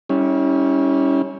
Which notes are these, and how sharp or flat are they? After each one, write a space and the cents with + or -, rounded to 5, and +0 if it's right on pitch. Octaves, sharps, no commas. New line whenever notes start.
G3 +0 C#4 +0 E4 -45